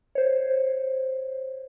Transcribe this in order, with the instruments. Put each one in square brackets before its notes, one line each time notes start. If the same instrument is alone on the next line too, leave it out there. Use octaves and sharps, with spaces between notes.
[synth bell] C5 C#5